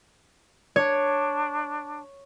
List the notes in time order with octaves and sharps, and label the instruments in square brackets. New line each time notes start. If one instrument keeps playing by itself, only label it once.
[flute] D4 [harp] C#5